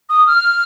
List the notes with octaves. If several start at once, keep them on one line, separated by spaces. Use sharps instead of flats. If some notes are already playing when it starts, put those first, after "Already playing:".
D#6
F6